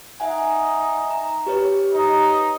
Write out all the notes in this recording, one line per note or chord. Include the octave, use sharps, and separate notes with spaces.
D#4 E5 F#5 G#5
A#5
G4 B4 C#5
D#4